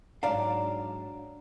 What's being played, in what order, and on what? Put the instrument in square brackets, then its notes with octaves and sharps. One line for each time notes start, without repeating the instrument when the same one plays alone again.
[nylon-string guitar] G#2 F#3 D#4 [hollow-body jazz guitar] D4 D5 F5 [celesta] A#5